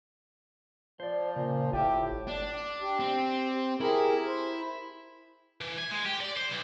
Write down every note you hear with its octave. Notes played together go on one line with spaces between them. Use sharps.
F3 C5 D5
A#2 C#3
G1 A2 F4 G4 E5
D4
G4
C4
E4 G4 G#4 A#4
C5
E3
G#5
G#3
G4
D5
C5
B1